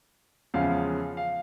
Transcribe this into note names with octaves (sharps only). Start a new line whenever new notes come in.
E2 C#3 F3 G#3 F5
F5